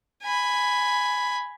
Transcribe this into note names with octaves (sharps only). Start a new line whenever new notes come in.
G#5 B5